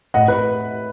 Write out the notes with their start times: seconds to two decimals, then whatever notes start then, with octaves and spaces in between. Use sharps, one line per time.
0.14 A2 D#5 F#5
0.28 B4